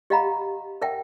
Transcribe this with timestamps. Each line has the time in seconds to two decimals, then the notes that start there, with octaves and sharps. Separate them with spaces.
0.10 G4 D#5 F5 F#5 A#5 B5
0.82 A#4 E5 F#5 G5